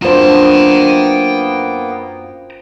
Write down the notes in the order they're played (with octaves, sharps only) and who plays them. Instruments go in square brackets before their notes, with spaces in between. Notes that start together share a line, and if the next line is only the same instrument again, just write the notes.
[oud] F#2 D4 [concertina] A#3 B3 [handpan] F4 C5 [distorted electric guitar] G5 A#5